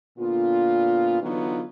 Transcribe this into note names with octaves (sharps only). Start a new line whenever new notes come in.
A#2 D3 B3 F4
D3 E3 F#3 B3 D#4 F4